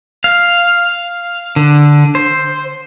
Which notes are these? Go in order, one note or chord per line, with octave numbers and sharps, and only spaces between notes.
F5
D3
C5